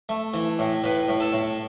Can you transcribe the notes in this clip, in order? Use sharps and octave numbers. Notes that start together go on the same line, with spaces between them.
A3
E3
A2
A2 B4
A2
A4
A2